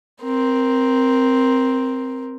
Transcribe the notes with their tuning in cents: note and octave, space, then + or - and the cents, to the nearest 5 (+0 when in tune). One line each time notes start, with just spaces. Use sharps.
C4 +0 A#4 +10